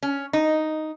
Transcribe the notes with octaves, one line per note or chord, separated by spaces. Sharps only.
C#4
D#4